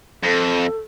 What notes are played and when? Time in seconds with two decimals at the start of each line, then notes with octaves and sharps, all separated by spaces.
0.23 F2 A4